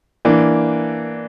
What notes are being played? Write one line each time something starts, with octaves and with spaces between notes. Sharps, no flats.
E3 A#3 D4